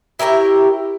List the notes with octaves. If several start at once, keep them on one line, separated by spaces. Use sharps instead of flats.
E4 G4 A#4 C#5